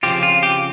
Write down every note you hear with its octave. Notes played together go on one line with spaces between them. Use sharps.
C#3 F3 C4 F4 G4
F4
G4